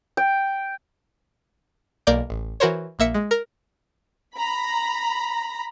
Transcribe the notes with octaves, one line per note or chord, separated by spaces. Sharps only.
G5
B1 A#3 D5 G6
A1
E3 F#4 A#4 C5 C#5
A#1 A#3 E5 C#7
G#3
A#4
A#5 B5